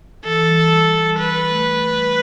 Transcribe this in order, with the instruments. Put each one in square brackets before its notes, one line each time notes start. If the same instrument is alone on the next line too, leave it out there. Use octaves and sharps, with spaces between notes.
[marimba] E3 [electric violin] A4
[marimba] E3
G3
G3
G3
[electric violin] B4
[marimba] A3
G3